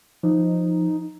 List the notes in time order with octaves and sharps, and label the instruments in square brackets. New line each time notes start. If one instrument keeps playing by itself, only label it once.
[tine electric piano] F3 [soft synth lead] D#4